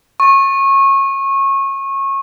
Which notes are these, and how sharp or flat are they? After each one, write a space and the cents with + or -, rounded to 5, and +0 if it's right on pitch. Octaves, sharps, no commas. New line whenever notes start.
C#6 -25